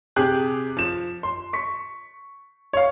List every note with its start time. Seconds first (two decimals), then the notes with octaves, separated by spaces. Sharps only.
0.16 C3 G4 G#4 D6 F#6
0.77 F3 E7
1.23 C6
1.53 C#6 B6
2.73 C#5 F5